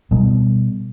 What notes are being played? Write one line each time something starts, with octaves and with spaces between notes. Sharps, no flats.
B2 G3 B3